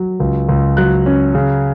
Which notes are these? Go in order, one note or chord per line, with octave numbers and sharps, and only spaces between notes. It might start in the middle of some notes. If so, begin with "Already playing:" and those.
Already playing: F#3
C#2
C#2
F#3 F#6
C#4
C#3